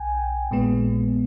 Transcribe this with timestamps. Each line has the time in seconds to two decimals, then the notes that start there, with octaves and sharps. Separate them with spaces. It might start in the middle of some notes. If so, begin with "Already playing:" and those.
Already playing: B1 G5 G#5
0.51 A#1 A#2 G#3 B3